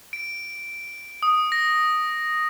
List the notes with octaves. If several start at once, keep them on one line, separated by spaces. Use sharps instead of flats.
D7
D#6
A#6